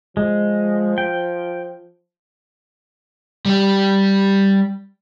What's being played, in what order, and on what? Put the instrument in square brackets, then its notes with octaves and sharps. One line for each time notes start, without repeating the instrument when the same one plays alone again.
[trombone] F3 [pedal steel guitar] G#3
[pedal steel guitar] G5
[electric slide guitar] G3 G4